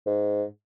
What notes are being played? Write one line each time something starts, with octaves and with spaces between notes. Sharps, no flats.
G#2